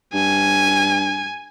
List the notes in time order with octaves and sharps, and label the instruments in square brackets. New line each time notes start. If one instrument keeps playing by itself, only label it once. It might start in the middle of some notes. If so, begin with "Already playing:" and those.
[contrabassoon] G2 [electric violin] G#5